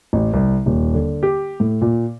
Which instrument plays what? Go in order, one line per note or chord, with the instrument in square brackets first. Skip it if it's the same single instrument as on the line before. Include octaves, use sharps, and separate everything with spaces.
[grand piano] A1
C2
D#1
D3
G4
A2
A#2